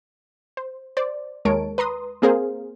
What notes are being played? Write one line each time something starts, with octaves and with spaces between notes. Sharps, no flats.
C5
C5 D5
D#2 G#3 A#4 C#5 A5 D7
B4 A#5 C6 D#6
A#3 C4 G#4 A#4 C5 F5